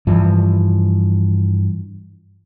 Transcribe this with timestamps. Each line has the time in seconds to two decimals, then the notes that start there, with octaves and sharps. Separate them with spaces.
0.07 G2 E3 F3